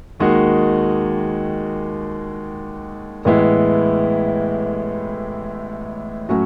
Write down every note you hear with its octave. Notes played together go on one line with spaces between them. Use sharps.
D#2 D#3 G#3 D#4 F#4
A1 A2 G#3 B3 E4
A2 F#3 C#4 F#4